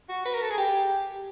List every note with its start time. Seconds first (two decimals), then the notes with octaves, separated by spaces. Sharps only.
0.09 F#4
0.25 B4
0.34 A#4
0.41 A4
0.50 G#4
0.58 G4